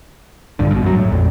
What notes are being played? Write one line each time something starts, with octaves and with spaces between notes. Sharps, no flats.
A#1 G2 D3
G2 B2
F#2 F#3
A2
A#1 F2